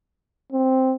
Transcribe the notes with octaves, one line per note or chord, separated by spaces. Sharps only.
C4